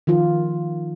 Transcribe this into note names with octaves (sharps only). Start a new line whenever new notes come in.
D#3 F3 F4